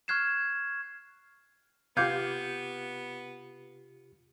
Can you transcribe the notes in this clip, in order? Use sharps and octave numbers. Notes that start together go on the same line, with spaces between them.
C#6 F6 F#6 G#6 C7 E7
C3 B3 F4 G4 F5 D6 G6 G#6